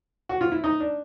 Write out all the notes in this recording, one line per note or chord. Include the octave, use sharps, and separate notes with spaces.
F#4
F4
E4
D#4
D4